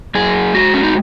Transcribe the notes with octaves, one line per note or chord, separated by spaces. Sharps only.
F#2 G#4
G#3 F#4
C#4
D#4